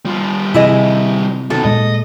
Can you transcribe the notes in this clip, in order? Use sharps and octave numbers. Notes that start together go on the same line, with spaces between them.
G3 F4
C3 E3 E4 G#4 D#5
B2 D#3 A4
A#2 G#3 D#5